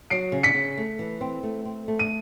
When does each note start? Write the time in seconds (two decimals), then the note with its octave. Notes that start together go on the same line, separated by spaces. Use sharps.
0.10 F#3 C7 D7
0.32 C#3
0.43 B6 C#7
0.54 C#3
0.77 A3
0.99 E3
1.21 C4
1.43 A3
1.65 C4
1.88 A3
1.99 D#7